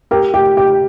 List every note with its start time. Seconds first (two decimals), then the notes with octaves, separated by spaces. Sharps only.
0.11 G4 A#4
0.34 G4
0.57 G4